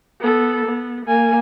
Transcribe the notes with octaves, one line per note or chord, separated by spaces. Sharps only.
B3 A4
B3
A#3 G#5